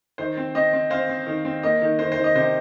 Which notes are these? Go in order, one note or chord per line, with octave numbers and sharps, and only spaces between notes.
D#3 C5
C4
C4 D#5
C4
C4 C5 F5
C4
D#3
C4
A#3 D#5
D#3
D#3 C5
C5
D#3
D#5
C3 C5